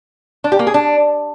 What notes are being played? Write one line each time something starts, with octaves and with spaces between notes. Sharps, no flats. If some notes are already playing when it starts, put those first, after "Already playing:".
D4
G4
A#3
G#4
D4